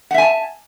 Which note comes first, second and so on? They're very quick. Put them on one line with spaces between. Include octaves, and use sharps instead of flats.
F#5 E5 G#5 A5